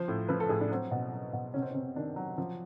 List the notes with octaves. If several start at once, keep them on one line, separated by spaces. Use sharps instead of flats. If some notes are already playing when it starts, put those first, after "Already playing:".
Already playing: F3 C5
A2
F3 B4
A4
A2 G#4
D4
F#3 C4
B2
F#3
B2
C3 C#4
C4
C3 C#4
D#3 D4
F#3
F3